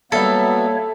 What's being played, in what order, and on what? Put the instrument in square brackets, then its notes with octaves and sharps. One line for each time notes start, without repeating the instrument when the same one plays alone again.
[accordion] F#3 B3 [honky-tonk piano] G3 E5 [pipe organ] A#3 C#5 [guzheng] A4